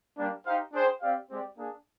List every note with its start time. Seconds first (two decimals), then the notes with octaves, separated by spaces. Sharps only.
0.17 G3 A#3 D4
0.44 D#4 G4 C5 F5
0.73 D4 G#4 C5 G5
1.01 C4 G4 D5 F5
1.29 G#3 C4 G4 D5
1.57 A#3 D4 G#4